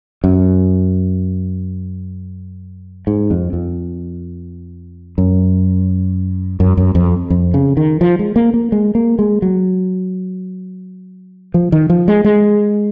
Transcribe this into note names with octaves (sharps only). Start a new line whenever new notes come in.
F#2
G#2
F2
F2
F#2
F#2
F#2
F2
F2
C#3
D#3
F3
G#3
A#3
A#3
G#3
A#3
G#3
F#3
F3
D#3
F3
G#3
G#3